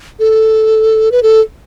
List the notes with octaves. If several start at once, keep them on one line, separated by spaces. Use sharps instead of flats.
A4
B4
A4